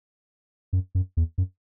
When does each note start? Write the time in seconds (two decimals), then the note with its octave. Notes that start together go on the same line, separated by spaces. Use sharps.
0.73 F#2
0.95 F#2
1.17 E2
1.38 F#2